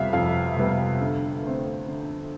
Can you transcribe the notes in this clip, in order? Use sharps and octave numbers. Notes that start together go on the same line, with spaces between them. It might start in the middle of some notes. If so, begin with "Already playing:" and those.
Already playing: F2 C3 G3 B3 E5 F5
F2 F5
C3 G3 B3
D3
A3 C4
D3